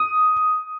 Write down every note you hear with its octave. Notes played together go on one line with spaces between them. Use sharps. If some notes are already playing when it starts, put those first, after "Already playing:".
Already playing: D#6